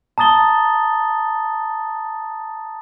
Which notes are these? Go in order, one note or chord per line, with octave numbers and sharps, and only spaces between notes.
A5 A#5 D#6 A6 G7